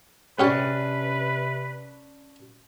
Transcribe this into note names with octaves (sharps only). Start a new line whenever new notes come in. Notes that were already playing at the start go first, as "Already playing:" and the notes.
G#2 C3 C#4 D4 G4 B4 C#5